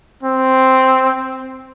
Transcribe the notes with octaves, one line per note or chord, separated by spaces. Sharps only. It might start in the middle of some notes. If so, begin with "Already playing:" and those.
C4